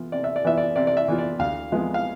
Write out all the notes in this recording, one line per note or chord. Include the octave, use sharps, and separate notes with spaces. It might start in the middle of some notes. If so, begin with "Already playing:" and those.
Already playing: E3 B3 F4
C3 D5
E5
D5
E3 B3 F4 E5
D5
C3 D5
D5
E5
E3 B3 F4
D5
D2 F5
C3 F3 G#3 B3
F5